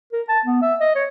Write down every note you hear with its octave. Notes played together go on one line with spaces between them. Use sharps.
A#4
A5
B3
E5
D#5
C#5